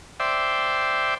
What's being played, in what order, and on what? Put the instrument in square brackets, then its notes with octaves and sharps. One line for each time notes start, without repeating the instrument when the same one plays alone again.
[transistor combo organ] C5 D5 E5 G5